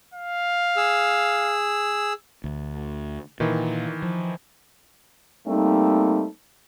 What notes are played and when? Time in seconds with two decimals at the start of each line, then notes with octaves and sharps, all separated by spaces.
0.14 F5
0.77 G#4 E6
2.44 D2
3.40 A#2 D#3 E3
4.03 F3
5.47 G3 A3 A#3 C4 D#4